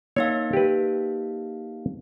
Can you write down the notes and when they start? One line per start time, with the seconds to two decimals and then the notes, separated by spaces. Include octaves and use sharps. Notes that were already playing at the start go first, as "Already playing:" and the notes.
0.16 A#3 D#4 C#5 F5
0.53 G4 B4